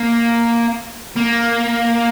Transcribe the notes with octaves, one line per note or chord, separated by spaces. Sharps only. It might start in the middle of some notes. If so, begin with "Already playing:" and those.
Already playing: A#3
A#3